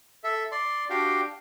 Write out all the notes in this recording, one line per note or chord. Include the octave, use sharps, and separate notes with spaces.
A4 E5
D5 C6
D4 F#4 G4 F5 G5